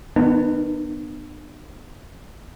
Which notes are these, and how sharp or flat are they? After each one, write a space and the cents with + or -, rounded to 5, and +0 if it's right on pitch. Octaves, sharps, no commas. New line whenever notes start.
D#3 +0 B3 +0 D4 +45